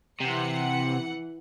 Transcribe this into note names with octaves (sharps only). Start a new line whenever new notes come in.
C3 E3 F#5 C#7